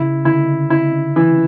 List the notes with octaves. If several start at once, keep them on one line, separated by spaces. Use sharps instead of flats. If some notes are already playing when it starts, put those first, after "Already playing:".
Already playing: C#3 E4
D3 E4
E4
E3